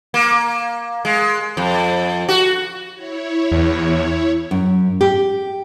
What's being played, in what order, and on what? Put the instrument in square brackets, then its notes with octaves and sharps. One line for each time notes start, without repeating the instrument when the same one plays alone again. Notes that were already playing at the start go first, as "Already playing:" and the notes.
[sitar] A#3
G#3
F2
F#4
[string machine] E4 C#5
[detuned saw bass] E2
[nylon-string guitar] F#2
G4